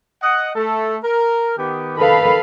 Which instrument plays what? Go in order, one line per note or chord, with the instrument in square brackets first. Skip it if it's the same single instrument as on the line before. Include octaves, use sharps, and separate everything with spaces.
[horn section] D#5 F#5
A3 A4
A#4
D#3 B3 G4
[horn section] D#3 B5 [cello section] A4 B4 F5